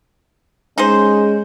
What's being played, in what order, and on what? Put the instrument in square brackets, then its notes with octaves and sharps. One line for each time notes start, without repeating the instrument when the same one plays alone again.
[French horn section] G#3 C#4 [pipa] D#4 G#4 C5